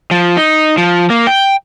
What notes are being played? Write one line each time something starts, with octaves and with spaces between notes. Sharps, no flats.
F3
D#4
F3
A#3
G5